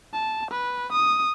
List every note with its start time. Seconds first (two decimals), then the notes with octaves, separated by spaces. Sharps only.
0.13 A5
0.51 B4
0.92 D#6